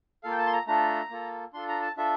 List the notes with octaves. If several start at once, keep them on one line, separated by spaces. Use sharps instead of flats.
A#3 F4 A4 F5
G5
A5
C6
A#5
A3 D4 F4 A4 A#5
A#3 F4 A4
D4 F4 A4 C6
A#5
A5
D4 F4 A4 E5